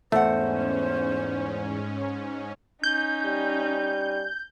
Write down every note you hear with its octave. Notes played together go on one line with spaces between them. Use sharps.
E2 G#2 A3 C#4 C5 F#5
C#4 D#4 G6
G3